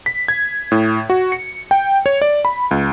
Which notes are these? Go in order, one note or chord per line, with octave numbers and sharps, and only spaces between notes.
B6
G#6
A2
F#4
C#7
G5
C#5
D5
B5
C#2